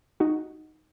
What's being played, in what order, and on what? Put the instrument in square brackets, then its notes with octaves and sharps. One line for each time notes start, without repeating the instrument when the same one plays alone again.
[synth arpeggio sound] D#4 F#4